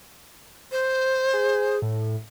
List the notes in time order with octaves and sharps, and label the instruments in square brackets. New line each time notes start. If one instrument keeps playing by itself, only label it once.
[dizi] C5
[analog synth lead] G#4
A2